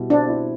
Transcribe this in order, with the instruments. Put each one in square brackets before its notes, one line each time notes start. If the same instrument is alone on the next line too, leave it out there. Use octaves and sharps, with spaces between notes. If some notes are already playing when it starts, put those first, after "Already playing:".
Already playing: [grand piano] B2 G3 E4
[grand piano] C4 [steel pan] D4
[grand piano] E4